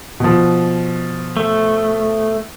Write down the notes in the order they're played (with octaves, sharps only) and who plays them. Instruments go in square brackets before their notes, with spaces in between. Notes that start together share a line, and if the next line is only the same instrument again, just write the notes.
[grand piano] B2 F3
[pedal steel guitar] A3